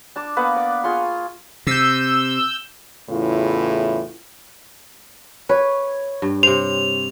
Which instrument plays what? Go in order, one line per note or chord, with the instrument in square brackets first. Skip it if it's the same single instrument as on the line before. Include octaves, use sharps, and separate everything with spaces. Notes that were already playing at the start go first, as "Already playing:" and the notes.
[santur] D4 A5 D6
A#3 B3 B4 F#5
D5
F4 G#4 C6 C#6
[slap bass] C3 [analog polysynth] E6 G6
[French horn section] E2 A2 C#3 E3 E4 F4
[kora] B4 [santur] C#5
[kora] G2
[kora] C3 C5 [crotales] F7